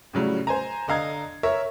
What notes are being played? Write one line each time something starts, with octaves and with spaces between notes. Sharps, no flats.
A2 C#3 F#3 G3
C5 G#5 A#5
D3 D#5 F5 A#5 G#6
A#4 C#5 E5